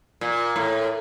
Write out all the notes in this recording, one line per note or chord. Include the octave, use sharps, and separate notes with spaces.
A#2
A2